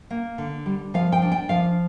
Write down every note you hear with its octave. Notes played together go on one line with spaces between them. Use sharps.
A#3
D3
G3
F3 F5
G5
D4
G5
F3 F5